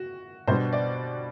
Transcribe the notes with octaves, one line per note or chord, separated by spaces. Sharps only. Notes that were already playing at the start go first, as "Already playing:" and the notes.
Already playing: F#4
B2 G3 B3 D4 C5
D5